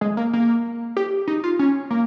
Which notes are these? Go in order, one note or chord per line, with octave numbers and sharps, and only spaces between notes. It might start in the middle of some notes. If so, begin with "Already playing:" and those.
G#3
A#3
A#3
G4
D#4
F4
C#4
A#3